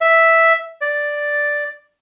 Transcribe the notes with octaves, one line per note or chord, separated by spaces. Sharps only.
E5
D5